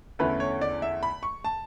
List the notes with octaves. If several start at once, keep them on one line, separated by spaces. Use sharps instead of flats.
E2 D3 A3 C#4 E4 B4
C#5
D5
E5
B5
C#6
A5